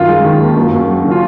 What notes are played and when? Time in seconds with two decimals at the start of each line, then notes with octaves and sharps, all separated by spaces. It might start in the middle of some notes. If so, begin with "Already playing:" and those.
Already playing: F#2 D#3 F4
0.08 G#3
0.24 D#3
0.40 D#2
0.57 F#2
0.72 F#2
0.88 F#3
1.04 C#3
1.11 F4